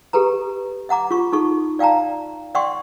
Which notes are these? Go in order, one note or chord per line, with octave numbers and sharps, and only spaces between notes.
G4 A4 B4 A#5
E5 F#5 A#5 D6
F4 C#6
D#4 A4 C#6
D5 F5 G5 A5 A#5
D5 E5 F#5 G5 C6 C#6